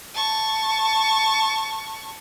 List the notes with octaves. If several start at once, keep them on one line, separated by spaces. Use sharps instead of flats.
A5 C#6